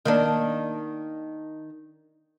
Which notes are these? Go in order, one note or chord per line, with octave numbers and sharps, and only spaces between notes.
D#3 A#3 D4